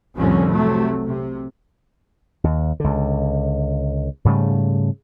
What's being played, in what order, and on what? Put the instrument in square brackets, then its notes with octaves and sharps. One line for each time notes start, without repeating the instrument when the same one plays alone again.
[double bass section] F1 C2 A2 D3 F3 C#4
C3 F#3 A3
C3
[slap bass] D#2
C#2 D3
G#2 C#3 G3 A3